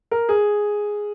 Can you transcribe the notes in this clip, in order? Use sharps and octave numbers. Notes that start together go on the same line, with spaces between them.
A#4
G#4